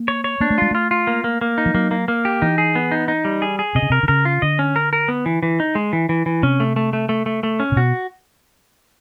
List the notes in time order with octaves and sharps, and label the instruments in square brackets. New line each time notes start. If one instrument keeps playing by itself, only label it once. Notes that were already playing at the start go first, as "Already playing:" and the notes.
Already playing: [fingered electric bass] A#3
[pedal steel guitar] C#5
C#5
[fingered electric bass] A#3 [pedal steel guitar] D4
[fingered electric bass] A3
[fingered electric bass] G#3 [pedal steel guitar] F4
[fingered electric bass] A3 [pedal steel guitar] F4
[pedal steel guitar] F4
A#3
A#3
A#3
D#4
[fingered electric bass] F3
[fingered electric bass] F#3 [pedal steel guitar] A#3
[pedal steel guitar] A#3
A#3
G4
[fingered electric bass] E3 [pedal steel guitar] D#4
[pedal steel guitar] G#4
B3
D#4
D#4
G3
G#4
G#4
[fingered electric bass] C3 [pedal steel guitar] D#5
[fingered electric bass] C#3
[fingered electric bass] C3 [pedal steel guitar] A#4
[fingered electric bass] D3
[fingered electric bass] C#3 [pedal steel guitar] A#4
[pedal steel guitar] F4
[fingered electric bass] D3 [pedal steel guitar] D#5
[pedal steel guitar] C#4
A#4
A#4
B3
E3
E3
D#4
G#3
E3
E3
E3
[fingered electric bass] C3 [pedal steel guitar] C#4
[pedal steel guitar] A3
A3
A3
A3
A3
A3
C#4
[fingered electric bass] C3
[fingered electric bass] B2 [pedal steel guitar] F#4